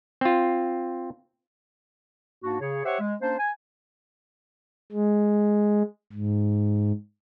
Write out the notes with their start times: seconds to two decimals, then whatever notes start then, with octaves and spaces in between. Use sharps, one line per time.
0.21 C4 F4
2.43 G#2 A#3 D4 F#4
2.61 C#3 G#4 C#5
2.85 G4 C5 C#5 E5 F#5
3.00 G#3
3.21 A#3 C#4 D4 C5
3.39 G#5
4.92 G#3
6.12 G#2